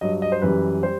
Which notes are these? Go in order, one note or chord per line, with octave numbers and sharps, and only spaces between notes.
G2 F#3 D#5
D#5
C5
F#2 E3 G3 B4
G3 C5